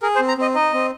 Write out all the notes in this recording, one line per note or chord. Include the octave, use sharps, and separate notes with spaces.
G#4 A#4
C5
C4
A#5
C4 D#5
D#4 D#5
C4